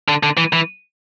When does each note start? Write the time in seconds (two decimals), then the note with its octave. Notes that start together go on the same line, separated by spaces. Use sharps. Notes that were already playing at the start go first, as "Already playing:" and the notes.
0.08 D3
0.23 D3
0.37 E3
0.53 E3